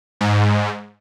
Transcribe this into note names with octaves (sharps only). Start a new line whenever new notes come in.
G#2